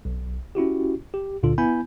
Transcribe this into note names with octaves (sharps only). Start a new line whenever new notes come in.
B1
C#4 E4 F#4 G4
G4
C#2 A#2 D3 F4 A4
B3 E4 G#5 B5 G6